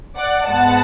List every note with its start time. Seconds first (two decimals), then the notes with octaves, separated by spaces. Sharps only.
0.18 D5 F#5
0.47 G#2 G#3 B3 F#5 A5